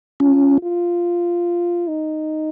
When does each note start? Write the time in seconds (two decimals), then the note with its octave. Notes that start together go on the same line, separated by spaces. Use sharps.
0.20 C#4 F4
0.62 F4
1.88 D#4